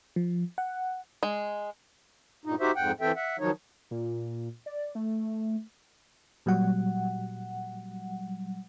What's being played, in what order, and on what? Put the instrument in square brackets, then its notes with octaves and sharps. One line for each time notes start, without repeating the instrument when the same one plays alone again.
[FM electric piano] F3
F#5
[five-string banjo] G#3
[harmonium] G2 A#2 D#4
D#4 F#4 G4 C5 E5
F2 G#2 F#5 G5
E3 C4 A4 E5 G5
E5 F#5
D#3 F3 F#3 D#4 C#5
[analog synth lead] A#2
D5
A3
[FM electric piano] A#2 F#3 G3 F#5